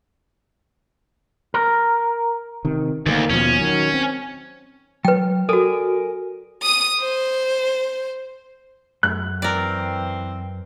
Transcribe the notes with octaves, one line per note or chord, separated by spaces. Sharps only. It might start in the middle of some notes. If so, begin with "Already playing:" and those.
A#4
C3 D#3
D2 D#3 G#3 A#3
D#2 B2 F3 C#4
D#3 F#3
C4
F#3 B4 G5
F#4 A4 A#4 D5 G#5
D#6 D#7
C5
F#2 F#6
E3 C4 A#4 D5